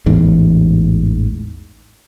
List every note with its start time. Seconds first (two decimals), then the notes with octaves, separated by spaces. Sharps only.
0.06 A1 E2 G#2